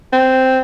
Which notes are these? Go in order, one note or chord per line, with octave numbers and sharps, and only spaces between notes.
C4